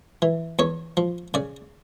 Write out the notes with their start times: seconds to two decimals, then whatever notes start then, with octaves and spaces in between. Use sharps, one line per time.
0.22 E3
0.59 E2 C#5
0.97 F3
1.34 C#3 D5